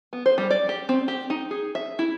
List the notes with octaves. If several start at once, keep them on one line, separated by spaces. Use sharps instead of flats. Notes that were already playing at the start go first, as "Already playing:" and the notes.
B3
C5
G3
D5
G4
C4
G4
D#4
G#4
E5
E4